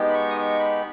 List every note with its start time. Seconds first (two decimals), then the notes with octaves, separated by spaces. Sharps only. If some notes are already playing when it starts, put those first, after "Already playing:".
Already playing: G#3 B3 D#4 G4
0.10 B5
0.14 C#6
0.31 D#6
0.37 C#6
0.59 B5